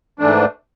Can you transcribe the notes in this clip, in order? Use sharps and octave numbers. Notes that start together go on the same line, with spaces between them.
G#2 E3 A3 D4